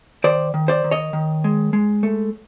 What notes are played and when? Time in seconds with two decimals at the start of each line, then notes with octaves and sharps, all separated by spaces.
0.24 D#3 C5 D5
0.54 D#3
0.68 C5 D5
0.84 D#3
0.91 C#5 D#5
1.13 D#3
1.44 G#3
1.73 G#3
2.03 A3